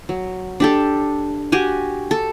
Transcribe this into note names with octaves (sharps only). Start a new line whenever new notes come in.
F#3
D4 G4 A4
F#4 G4 G#5
A4